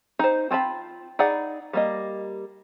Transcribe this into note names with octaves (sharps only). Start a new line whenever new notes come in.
D#4 C5
C4 F4 A5 B5
D#4 G#4 D5 F#5 B5
G3 A#3 D#5